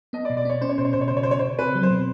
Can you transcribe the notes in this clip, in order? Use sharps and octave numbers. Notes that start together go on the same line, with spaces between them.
B3 D#5
D5
B2
D5
B3 C#5
C#4 C5
C#5
B2 C5
C#5
B2 C5
C#5
C5
C#3
C#5
C5
C#3 C#5
C#3 C5
C4 B4
F#3
C5
B2